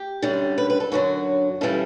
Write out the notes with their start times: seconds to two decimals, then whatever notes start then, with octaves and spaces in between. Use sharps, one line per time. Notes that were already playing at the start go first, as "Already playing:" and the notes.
Already playing: G4
0.22 F#2 D3 G3
0.58 B4
0.70 B4
0.80 A4
0.92 F#2 D3 F#3 F#4
1.61 C#3 E3 G3 A4